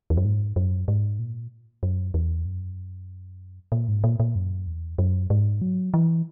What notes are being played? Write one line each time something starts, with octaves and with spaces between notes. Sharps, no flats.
E2
F#2
G#2
F#2
G#2
A#2
F#2
E2
F#2
A#2
G#2
A#2
A#2
F#2
E2
F#2
G#2
F#3
E3